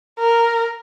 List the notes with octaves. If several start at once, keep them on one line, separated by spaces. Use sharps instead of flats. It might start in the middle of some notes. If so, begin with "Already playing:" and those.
A#4